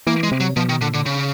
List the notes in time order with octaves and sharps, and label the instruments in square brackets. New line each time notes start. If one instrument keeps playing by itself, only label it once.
[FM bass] E3 [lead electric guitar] A#3
[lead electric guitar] G#3
[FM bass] C3
[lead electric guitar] F#3
[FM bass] B2 [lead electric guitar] F3
[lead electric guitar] D#3
[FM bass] A#2 [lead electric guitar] D3
[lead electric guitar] D3
C#3